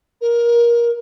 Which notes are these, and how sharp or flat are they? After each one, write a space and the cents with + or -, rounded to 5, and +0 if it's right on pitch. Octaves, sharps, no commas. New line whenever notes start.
A#4 +20